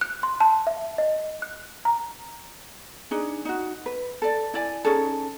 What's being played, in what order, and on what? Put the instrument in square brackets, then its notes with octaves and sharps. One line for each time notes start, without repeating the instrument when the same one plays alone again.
[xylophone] F#6
C6
A5
E5
D#5
F#6
A#5
[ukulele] D4 D#4 G#4
D#4 F#4
B4
A4 D5
E4 D5 G#5
C#4 D#4 G#4 A4